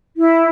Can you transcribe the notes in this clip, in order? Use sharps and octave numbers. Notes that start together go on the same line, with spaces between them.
E4